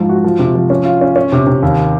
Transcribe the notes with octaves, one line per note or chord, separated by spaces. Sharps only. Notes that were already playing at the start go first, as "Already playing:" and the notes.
Already playing: G#2 F3
F#4
F3
C3
F3
C#4
F4
C#4
C#4
C3
C3
D#2